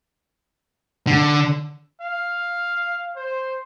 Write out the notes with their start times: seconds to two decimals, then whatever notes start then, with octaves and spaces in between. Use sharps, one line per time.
1.07 D3
2.01 F5
3.16 C5